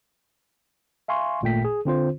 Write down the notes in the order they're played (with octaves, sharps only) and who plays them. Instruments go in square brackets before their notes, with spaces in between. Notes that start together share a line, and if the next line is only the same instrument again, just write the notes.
[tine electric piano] E5 F5 G#5 C6 C#6
G#1 A#2 A3 G5 B6
G#4
D3 C4 F4 C5